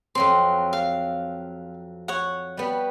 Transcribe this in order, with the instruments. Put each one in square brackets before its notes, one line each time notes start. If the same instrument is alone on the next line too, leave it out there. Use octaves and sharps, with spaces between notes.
[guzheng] F2 F#3 C4 [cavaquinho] C6
[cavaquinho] F5
C#5 F#5
[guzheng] G3 B3